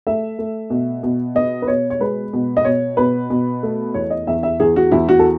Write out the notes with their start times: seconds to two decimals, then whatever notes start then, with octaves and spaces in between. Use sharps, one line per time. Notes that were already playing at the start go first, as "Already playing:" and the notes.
0.07 A3 E5
0.39 A3
0.70 B2
1.03 B2
1.35 B3 D#5
1.62 B4
1.68 B2 C#5
1.90 C#5
2.00 G#3 B4
2.33 B2
2.57 D#5
2.65 B2 C#5
2.97 B2 B4
3.30 B2
3.63 A3
3.94 E2 C#5
4.10 D#5
4.27 E2 E5
4.43 E5
4.60 E2 G#4
4.76 F#4
4.91 E2 E4
5.09 F#4
5.19 A4